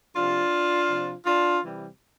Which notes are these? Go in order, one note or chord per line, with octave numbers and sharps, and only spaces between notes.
C3 F3 D4 F4
C3 F3
D4 F4
C3 E3 G3